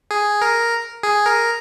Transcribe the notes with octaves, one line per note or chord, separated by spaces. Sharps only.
G#4
A#4
G#4
A#4